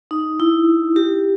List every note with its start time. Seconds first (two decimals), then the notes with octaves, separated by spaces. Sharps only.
0.11 D#4
0.40 E4
0.96 G4